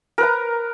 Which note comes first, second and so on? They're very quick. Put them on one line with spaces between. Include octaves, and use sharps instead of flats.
A#4 B4 A#5